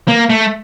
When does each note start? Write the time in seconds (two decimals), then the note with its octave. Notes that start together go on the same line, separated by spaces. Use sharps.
0.08 A#3
0.30 A3